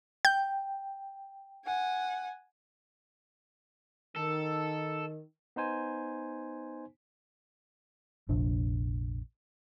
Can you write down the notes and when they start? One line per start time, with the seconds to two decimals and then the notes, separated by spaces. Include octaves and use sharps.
0.25 G5 G6
1.65 F#5 G#5
4.16 D#3 A4
5.56 B3 D#4 C5 G#5
8.29 F1 A#1 D4